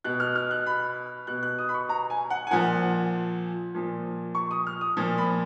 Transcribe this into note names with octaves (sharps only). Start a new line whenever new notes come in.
B2 F#6
F6
F6
F#6
B5
B2 F#6
F#6
D#6
B5
C#6
A#5
G#5
F#5
G#5
A#2 F3 F#5
A#2 F3
C#6
D#6
F6
D#6
A#2 F3
B5